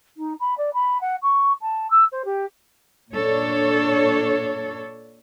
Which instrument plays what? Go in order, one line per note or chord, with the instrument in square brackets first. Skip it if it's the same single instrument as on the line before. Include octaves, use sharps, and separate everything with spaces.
[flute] D#4
B5
D5
B5
F#5
C#6
A5
E6
C5
G4
[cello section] A#2 D4 A4 C#5